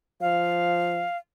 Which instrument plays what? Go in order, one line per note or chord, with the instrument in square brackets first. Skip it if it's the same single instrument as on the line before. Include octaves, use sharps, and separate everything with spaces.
[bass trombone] F3 [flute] F5